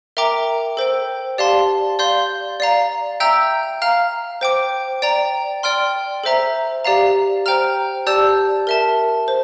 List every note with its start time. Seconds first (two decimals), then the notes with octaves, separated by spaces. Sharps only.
0.17 A#4 E5 G5 A#5 D6
0.77 A4 C5 G5
1.38 G4 D5 F5 A5 C6
1.99 D5 F5 C6 G6
2.60 D5 F5 A#5
3.20 E5 G5 A#5 E6 G6
3.82 F5 A#5 F6
4.41 C5 G5 D6
5.02 D5 G5 A#5
5.63 D5 G5 C6 F6
6.24 A4 C5 E5 A#5
6.85 G4 D5 F5 A#5
7.46 C5 G5 A#5 F6
8.07 G4 D5 A5 E6 G6
8.67 A#4 E5 A5
9.28 C5